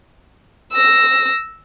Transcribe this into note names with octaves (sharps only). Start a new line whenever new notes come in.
E6 A#6